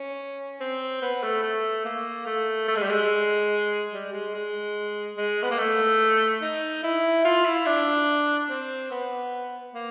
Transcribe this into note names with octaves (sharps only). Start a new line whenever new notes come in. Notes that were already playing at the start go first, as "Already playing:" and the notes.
Already playing: C#4
C4
B3
A3
A3
A#3
A3
A3
G#3
G3
G#3
G3
G#3
G#3
G#3
B3
A#3
A3
D#4
E4
F4
E4
D4
C4
B3
A#3